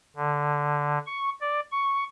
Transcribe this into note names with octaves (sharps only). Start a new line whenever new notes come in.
D3
C#6
D5
C#6